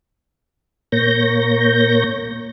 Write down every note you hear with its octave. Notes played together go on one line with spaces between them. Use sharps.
A#2 A#3 C#5 G6 A#6